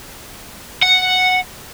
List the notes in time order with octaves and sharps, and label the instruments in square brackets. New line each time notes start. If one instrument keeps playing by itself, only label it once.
[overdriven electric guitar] F#5